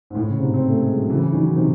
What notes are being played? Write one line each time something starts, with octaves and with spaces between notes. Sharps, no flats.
G#2
A2
C#3
G#2 C3
C4
A3
G#3
F#3
C#3 E3
E3
D#3 F#3
C3 D#3